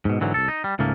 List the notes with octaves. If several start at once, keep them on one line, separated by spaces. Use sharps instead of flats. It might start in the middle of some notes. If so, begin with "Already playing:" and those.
G#2 B2
G#2 D3 E3 F#3
C2 F2 A4
D#4
G3
C#2 G#2 C#3 A3 A#3